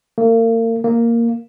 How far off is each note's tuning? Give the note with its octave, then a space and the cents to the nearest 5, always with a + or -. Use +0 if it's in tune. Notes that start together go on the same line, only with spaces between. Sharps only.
A#3 -40
A#3 -5